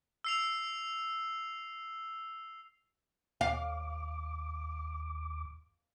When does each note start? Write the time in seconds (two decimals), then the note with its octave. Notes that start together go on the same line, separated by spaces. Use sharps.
0.24 E6 C7 F7
3.41 D#2 F5 D6